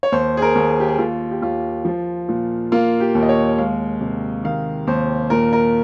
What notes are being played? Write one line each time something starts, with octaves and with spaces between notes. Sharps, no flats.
C#5
D#2 C5
G#4
A#4
D#2
G#4
G4
G#4
D#2 F4
G4
D#2 F4
F3
A#2
A#3 F4
G4
D#2
D#5
C#5
G#3 F5
C3
D#3 F5
D#2 C5
A#2 A#4
A#4